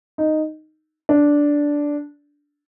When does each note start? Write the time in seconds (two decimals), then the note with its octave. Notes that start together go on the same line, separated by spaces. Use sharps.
0.18 D#4
1.09 D4